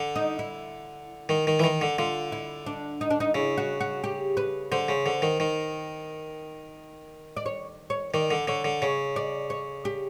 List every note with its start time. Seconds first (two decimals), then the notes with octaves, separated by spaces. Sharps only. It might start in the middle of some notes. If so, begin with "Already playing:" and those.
Already playing: D3
0.16 D#4
0.39 E4
1.29 D#3
1.47 D#3
1.60 E3
1.64 D#3
1.81 D3
1.98 D3 F4
2.32 E4
2.66 D4
3.01 D#4
3.10 D4
3.20 D#4
3.34 C#3 E4
3.57 F#4
3.80 F#4
4.04 G4
4.37 B4
4.72 D3 C5
4.88 C#3
5.06 D3
5.22 D#3
5.40 D#3
7.37 D5
7.46 C#5
7.90 C#5
8.14 D#3 D5
8.31 D3
8.48 D3 C#5
8.64 D3
8.82 C#3 C#5
9.16 D5
9.50 C#5
9.85 G4